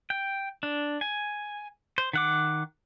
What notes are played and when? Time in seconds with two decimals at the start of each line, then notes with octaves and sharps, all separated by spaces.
0.10 G5
0.63 D4
1.01 G#5
1.98 C5
2.13 D#3 F#5 D6